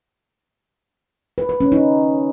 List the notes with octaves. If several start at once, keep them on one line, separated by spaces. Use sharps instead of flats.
B4
B4
C#4
D#4